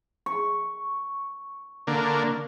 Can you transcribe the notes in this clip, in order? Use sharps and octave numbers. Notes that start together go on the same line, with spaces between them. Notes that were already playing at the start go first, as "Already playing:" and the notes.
C#6
D3 A#3